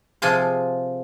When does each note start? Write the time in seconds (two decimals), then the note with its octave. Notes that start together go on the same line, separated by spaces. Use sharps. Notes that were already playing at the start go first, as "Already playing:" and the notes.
0.22 C3 F3 F4 G#4 F5 C6